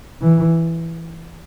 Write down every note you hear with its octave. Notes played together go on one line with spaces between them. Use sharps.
E3